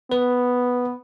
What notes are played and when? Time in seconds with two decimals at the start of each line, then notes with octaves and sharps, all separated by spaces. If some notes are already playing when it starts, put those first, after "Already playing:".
0.11 B3 B4